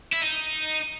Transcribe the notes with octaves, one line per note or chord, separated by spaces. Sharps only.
E4
D#4